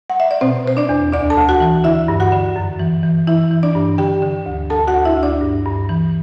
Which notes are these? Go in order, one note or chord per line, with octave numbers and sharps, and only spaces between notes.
F#5
E5
D5
B2 C4 C5
B2 C5
D4 D5
E2
D2 D4 D5
A4 A5
D2
F#4 F#5
E3
D3 E4 E5
G2
F#4 F#5
D3
F#2
E3
E3
E3 E4 E5
E3
D4 D5
G2
D3 G4 G5
D3
D2
D2 A4 A5
F#4 F#5
D2
E4 E5
D2
D4 D5
G2
G2
E3